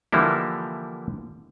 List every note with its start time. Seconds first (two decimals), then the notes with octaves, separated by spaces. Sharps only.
0.12 D3 E3 F3 G3 A#3 E4